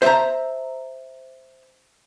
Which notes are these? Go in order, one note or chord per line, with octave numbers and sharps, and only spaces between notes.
C5 E5 F5 A5 A#5